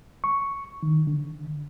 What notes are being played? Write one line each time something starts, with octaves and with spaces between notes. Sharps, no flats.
C#6
D#3
D3